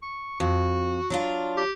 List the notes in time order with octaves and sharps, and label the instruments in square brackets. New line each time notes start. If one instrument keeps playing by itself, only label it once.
[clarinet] C#6
[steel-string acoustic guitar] F2 [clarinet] F#4
[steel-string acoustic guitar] F#3 D4 F4
[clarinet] G4